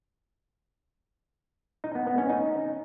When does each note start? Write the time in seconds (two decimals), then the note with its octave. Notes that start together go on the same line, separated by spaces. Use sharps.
1.84 D#4
1.95 B3
2.07 B3
2.18 C#4
2.29 D#4